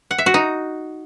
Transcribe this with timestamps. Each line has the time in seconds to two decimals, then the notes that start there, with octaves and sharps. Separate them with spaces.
0.11 F#5
0.18 E5
0.26 F#4
0.34 D#4